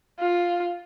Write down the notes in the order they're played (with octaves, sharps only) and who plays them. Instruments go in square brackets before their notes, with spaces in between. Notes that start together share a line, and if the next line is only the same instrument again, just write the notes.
[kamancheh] F4